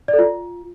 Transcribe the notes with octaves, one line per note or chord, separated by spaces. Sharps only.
D5
A4
F4